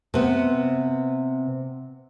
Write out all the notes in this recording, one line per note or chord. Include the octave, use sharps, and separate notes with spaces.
C3 B3